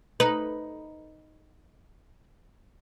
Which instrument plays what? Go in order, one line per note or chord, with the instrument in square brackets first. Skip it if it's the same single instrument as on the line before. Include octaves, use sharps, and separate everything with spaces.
[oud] D#4 B4